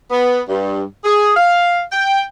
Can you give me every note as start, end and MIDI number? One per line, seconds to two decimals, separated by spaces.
0.11 0.41 59
0.49 0.83 43
1.04 1.32 68
1.36 1.81 77
1.91 2.21 79